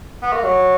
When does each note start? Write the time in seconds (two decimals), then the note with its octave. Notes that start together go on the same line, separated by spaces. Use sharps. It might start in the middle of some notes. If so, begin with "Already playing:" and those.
0.22 B3
0.33 A#3
0.43 F#3